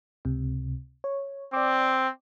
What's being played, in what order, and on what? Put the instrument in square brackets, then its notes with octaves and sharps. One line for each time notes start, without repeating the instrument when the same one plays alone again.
[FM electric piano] C#2 C3
C#5
[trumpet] C4 [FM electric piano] D5 D6